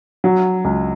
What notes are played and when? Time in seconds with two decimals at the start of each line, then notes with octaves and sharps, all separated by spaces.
0.24 F#3
0.64 C#2